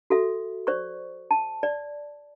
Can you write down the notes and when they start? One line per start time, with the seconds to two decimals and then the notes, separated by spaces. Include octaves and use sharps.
0.10 F#4 A4 E5
0.67 C5 D5 C#6
1.31 A5
1.63 D5